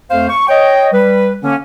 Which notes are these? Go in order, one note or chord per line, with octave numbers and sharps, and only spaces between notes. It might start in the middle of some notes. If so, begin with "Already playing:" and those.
F2 A3 C5 F5
C#6
C#5 D#5 G5
G3 B4
D3 A#3 C#4